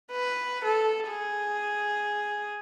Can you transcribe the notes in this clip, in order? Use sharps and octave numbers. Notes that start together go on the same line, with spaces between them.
B4
A4
G#4